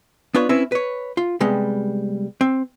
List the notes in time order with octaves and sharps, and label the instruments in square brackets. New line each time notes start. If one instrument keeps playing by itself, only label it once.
[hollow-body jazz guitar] B3 D4 F4 B4 C#5
C4 C#4 E4 B4
B4 C#5
F4
C3 G3 G#3 B3
C4